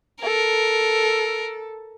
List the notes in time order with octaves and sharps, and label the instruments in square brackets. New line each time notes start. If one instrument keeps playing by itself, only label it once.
[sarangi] A4 [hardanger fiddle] A#4